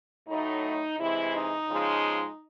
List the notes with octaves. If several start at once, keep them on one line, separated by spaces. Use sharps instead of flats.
A2 F#3 A3 D#4
C3 E3 G#3 E4
D#4
C#3 F3 G#3